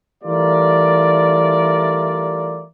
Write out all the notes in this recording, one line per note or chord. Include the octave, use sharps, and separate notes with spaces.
E3 G3 A3 F4 A#4 D5